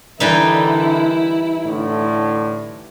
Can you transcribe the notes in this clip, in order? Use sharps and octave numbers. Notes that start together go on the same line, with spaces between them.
D3 E3 G3 D#4 E4 A#4
A2 D3